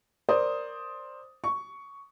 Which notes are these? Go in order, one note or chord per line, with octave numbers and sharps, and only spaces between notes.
A#4 C5 D5 D#6
C#6